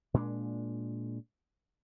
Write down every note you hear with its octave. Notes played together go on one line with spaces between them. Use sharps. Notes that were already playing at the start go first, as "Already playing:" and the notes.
A#2 G#3 C4 D4